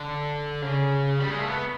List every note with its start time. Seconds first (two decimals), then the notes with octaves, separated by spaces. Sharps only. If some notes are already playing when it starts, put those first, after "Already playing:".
Already playing: D3
0.62 C#3
1.20 G3
1.30 G#3
1.40 A3
1.49 B3